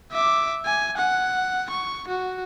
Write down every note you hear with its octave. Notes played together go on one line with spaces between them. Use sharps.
E5 D6
G#5
F#5
C#6
F#4